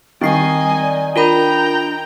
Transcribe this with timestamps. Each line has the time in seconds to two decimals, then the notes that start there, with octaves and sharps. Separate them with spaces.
0.21 D#3 G3 C4 D#5 G#5 C7
0.82 D5
1.16 D4 F4 A#4 G5 A#5 B5